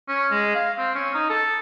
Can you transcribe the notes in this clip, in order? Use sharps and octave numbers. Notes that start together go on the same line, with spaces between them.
C#4
G#3
F5
C4
C#4
D#4
A4